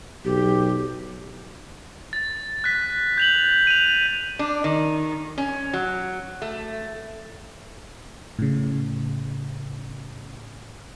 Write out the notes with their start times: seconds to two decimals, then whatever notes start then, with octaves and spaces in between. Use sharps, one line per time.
0.25 B1 G4
2.13 A6
2.64 F#6 B6
3.17 G6 F7 F#7
3.67 D#7 F7
4.39 D4
4.64 D#3
5.38 C#4
5.73 F#3
6.42 A3
8.39 A2 C#3